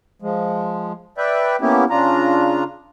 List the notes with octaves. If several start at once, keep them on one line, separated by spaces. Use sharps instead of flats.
F3 G#3
B4 D5 E5 G5
A#3 B3 C#4 E4 G4
C#3 D4 F4 A#5